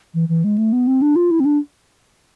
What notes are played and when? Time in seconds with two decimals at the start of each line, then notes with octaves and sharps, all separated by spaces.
0.14 E3
0.29 E3
0.44 G#3
0.58 A3
0.73 B3
0.87 C4
1.02 D4
1.16 F4
1.31 E4
1.40 C4
1.45 D4